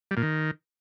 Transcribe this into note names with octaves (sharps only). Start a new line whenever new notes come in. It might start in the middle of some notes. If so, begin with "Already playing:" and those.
G3
A#2
D#3